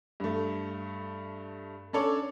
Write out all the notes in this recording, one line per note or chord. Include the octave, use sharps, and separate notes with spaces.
G2 A3
C#4 D4 A4 C#5 D5